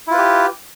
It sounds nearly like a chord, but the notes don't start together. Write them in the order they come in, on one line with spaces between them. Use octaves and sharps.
E4 F4 B4 G4